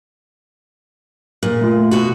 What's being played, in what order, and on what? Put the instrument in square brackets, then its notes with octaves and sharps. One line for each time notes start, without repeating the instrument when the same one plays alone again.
[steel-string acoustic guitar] A#2
[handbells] A3 F4
[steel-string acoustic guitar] B2 F#4